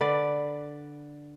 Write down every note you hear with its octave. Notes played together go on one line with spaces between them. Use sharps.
D3 B4 D5